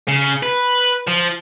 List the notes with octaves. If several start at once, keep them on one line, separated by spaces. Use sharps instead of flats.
C#3
B4
F3